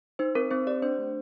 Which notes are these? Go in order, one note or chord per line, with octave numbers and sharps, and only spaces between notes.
D#4 C5
C4 A#4
C4 C5
G4 D5
D4 C5
A3